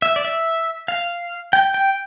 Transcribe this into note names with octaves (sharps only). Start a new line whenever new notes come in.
E5
D5
E5
F5
G5
G5